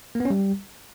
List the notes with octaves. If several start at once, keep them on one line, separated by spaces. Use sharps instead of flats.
A#3
B3
C#4
G3